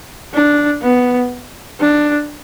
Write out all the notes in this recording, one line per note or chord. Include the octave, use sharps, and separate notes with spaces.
D4
B3
D4